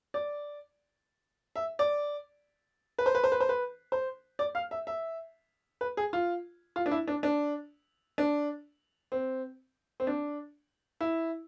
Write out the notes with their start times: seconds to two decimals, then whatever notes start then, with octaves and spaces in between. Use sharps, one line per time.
0.14 D5
1.56 E5
1.79 D5
2.98 B4
3.06 C5
3.15 B4
3.24 C5
3.32 B4
3.40 C5
3.49 B4
3.92 C5
4.39 D5
4.55 F5
4.71 E5
4.87 E5
5.81 B4
5.97 G#4
6.13 F4
6.76 F4
6.86 D4
6.91 E4
7.07 D4
7.23 D4
8.18 D4
9.12 C4
10.00 C4
10.07 D4
11.01 E4